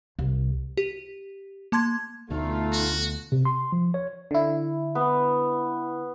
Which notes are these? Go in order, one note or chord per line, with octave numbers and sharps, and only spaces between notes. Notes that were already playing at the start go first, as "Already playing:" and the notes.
C2
G4
A#3 A5 C6 G#6
D2 B2 A3 D#4 F4
F#4
C3
C6
F3
C#5
D3 E4
B3